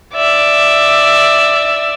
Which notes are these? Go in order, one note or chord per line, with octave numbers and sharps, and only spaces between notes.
D5 E5